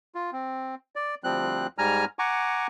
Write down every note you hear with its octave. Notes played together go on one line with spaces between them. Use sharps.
F4
C4
D5
D2 F3 G3 C4 F#6
G#2 G3 G#5 A#5 F6
F#5 G#5 A#5 C#6 D6